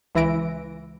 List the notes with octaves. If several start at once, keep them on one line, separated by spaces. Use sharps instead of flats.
C#2 E3 E4 A#6 D7